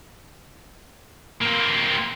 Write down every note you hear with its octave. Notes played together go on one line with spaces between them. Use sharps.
A#3 C4